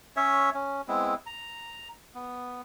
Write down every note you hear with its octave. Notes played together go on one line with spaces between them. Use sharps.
C#4 C#5 E5
C#4
G#3 B3 C4 E4
A#5
B3